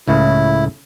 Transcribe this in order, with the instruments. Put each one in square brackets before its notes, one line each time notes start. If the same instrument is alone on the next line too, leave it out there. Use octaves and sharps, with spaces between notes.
[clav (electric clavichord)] C#2 A2 C#3 [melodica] E4